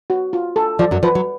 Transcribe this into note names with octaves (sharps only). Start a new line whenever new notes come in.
F#4
F4
A4
F3 D5
F#2 F#3
F3 B4
F#3